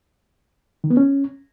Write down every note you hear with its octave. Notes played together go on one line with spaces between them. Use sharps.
D#3
B3
C#4